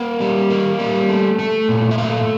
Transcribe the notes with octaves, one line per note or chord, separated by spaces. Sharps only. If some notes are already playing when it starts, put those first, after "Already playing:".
Already playing: A#3 F#5
G3
A#3
G3
A3
A3
A#2
E5
A3 F5